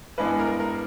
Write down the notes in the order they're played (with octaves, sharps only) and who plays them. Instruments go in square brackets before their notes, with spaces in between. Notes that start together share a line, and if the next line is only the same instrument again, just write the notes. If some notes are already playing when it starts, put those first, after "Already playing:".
[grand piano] G2 E3 G#3 B3 B4
A#4
A#4